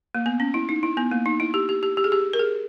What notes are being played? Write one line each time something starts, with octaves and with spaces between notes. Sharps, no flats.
A#3
B3
C#4
E4
D#4
E4
B3
A#3
D#4
E4
G4
G4
G4
G4
G#4
G4
A#4
G#4